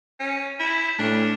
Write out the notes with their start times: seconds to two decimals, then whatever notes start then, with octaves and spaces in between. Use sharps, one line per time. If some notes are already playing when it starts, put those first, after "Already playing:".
0.20 C#4
0.60 E4
0.99 A2 D4